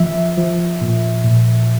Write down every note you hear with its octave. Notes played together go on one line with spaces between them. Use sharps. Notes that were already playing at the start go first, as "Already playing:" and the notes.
Already playing: F3 E5
F3
A#2
A#2